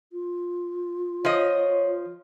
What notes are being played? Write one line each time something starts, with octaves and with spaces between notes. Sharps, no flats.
F4
F3 C#5 D#5